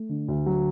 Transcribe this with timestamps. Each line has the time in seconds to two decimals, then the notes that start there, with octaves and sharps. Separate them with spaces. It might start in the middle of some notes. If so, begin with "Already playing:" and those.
Already playing: A3
0.09 D3
0.28 D2
0.46 F#3